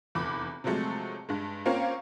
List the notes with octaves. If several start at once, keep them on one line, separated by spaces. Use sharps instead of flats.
F1 E2 B5 D6
C3 F3 F#3 G#3 A3
G2 G#3
A#3 C4 C#4 F4 A#4 F5